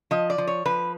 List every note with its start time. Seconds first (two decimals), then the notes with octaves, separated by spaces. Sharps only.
0.11 F3 D#5
0.30 D5
0.38 F3
0.47 C#5
0.65 F3 B4